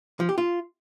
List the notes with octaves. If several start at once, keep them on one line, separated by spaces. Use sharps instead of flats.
F3
G4
F4